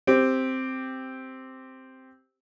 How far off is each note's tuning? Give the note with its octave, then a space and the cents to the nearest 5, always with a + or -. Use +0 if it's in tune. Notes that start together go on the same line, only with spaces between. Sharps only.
C4 +0 G4 +0